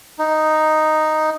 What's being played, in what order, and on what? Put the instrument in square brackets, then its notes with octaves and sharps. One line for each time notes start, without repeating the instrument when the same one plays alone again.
[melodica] D#4